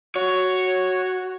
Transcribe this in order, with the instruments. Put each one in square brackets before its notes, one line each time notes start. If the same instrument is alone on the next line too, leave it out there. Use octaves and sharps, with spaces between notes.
[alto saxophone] F#4 [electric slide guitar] C#5